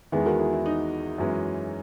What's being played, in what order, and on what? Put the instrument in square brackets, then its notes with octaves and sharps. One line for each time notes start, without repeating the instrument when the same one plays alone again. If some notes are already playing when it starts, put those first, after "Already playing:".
[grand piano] E2 D#3 G#3 B3 [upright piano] E4 G#4
[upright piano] F#4 A#4
E4 G#4
E4
D#4
[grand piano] F#2 E3 G#3 C#4